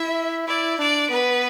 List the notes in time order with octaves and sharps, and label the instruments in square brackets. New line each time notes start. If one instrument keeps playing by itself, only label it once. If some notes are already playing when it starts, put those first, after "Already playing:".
Already playing: [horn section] E4 [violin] E5
[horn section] E4 [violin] D5
[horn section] D4 [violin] D5
[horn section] B3 [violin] B4